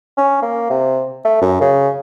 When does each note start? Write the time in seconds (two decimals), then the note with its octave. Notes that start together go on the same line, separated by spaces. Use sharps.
0.17 C#4
0.42 A#3
0.70 C3
1.25 A3
1.41 F#2
1.61 C#3